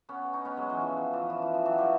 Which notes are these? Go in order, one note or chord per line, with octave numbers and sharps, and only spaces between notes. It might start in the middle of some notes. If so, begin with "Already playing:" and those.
B3 C#4
C#4 D#4
B3 C#4
F#3 G#3
E3 F#3
F3
F3
E3
F3
E3
F3
E3 F#3
F3 G3